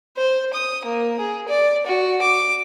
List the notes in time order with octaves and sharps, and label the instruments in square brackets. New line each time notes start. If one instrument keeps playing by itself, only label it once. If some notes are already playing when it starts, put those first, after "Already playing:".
[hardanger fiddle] C5
D#6
A#3
G#4
D5
F#4
D6